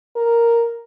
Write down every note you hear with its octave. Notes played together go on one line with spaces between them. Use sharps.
A#4